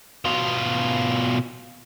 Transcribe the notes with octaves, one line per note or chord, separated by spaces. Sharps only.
B2 F4